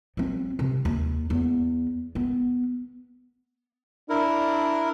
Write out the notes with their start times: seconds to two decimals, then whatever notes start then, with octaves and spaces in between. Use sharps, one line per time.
0.17 F#3 C4
0.59 C3
0.85 D#2
1.30 E2
2.15 B3
4.10 D4 E4 A#4